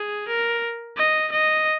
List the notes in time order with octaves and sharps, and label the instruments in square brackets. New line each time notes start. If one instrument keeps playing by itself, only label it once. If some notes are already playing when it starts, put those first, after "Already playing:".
Already playing: [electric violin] G#4
A#4
D#5
D#5